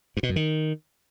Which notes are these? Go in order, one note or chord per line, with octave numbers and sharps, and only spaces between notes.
G2
B2
F#2
D#3